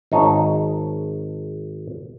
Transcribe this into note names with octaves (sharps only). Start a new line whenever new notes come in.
G#1 D#4 C#5 A5